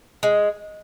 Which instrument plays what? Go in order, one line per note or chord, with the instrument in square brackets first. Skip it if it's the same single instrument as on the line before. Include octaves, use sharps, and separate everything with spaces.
[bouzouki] G#3